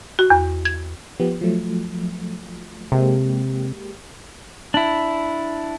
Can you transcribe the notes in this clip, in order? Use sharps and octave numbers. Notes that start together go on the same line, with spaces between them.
F#4
E2
G#6
F3 B3 G4
F3 F#3 A3
C3 G#3 A#3 G4
D4 E4